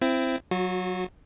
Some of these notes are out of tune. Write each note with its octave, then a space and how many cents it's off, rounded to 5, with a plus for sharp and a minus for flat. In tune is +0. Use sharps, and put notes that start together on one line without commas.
C4 +0 E4 +25
F#3 +0 F#4 -35